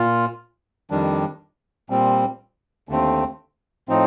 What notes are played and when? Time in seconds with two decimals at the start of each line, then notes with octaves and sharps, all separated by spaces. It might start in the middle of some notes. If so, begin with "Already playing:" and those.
Already playing: A#2 F4
0.90 F2 D#3 G3 D4
1.90 A#2 G3 C4
2.89 D#2 D3 A3 C4
3.89 A2 F3 C4 D#4